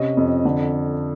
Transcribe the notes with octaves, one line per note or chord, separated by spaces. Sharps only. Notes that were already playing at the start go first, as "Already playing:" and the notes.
Already playing: C3 C#4 D#5
F2
D3